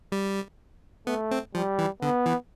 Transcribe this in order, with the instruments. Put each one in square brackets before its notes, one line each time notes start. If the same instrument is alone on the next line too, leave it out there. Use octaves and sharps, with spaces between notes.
[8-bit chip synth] G3
[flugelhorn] A3 [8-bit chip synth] B3
[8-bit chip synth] C4
[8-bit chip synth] F3 [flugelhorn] G3
[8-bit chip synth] E3
[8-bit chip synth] D3 [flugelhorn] B3
[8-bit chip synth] E3